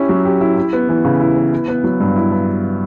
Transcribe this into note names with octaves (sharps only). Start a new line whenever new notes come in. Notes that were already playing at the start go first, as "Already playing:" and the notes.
Already playing: C#4 E4 G4
F#3
G4
E4
E4
B3
E3
C#3
E4
B3
E4
B3
F#3
G2
E4
B3